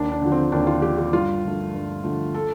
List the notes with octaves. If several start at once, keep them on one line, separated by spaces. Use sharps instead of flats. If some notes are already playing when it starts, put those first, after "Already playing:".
Already playing: D#2 D4
D4
D3 F3
C4
D#2 D4
F4
D3 F3 G4
G4
G2 F4
D3 F3 A3
G2
D3 F3 A3
A4